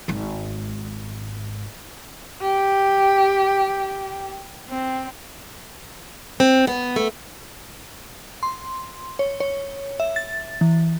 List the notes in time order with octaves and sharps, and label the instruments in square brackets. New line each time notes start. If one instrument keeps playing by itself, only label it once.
[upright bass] G#1 G#2
[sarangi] G4
C4
[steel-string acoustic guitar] C4
B3
A3
[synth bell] C6
C#5
C#5
E5
A6
E3